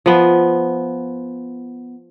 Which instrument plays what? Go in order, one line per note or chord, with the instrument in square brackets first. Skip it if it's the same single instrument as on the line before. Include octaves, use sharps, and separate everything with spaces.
[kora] F3 B3